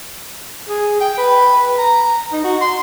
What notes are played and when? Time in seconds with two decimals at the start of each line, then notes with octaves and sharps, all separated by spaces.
0.69 G#4
1.01 G5
1.18 B4
1.78 A#5
2.32 D#4
2.44 F#4
2.61 C6